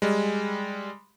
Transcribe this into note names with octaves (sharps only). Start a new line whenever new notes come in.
G3 G#3